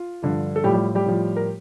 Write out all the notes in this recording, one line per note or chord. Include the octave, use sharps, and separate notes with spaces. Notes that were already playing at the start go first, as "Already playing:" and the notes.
Already playing: F4
G2 D3 F3
A4
A2 F3 G3 G4
G3 G4
G3 G4
A2 F3
A#4